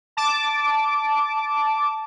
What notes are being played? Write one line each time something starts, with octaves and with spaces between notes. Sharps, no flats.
A5 D6